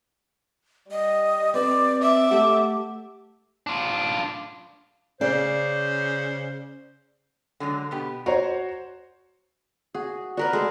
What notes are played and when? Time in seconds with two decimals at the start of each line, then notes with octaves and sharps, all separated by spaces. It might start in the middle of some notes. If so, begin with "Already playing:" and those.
0.91 G3 D#5
1.54 C4 B4 C5 D5
2.02 E5 D6
2.31 A3 G4 F#5
3.67 D4 F4
5.21 C#3 C5 D5
7.60 D3 F#3 G#3
7.91 B2 B3 G4
8.26 F#4 C5 C#5 A#5
9.95 F#4 G#4
10.37 F#4 A#4 B4 D5
10.53 G#3 A3 A4